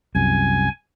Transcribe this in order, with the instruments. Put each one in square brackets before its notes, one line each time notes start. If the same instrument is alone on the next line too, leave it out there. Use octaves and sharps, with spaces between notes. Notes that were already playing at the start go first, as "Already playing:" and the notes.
[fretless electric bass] C2 F#2 [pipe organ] G#5